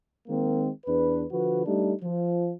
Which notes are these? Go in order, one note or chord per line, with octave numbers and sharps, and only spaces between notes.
D#3 G#3 A#3 C4
E2 D4 B4
D3 F3 F#4 B4
G3 A3 D4 D#4
F3